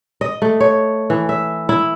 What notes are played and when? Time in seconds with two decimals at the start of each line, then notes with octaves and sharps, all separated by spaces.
0.21 D#5
0.42 A3
0.60 C#5
1.10 E3
1.29 E5
1.69 E4